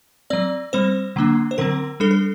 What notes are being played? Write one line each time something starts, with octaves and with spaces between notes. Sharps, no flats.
F#3 C4 D5
G3 C4 C5
D3 F#3 A#3 D4
C5
D3 F#3 C4 A#4
G3 D4 A4
A4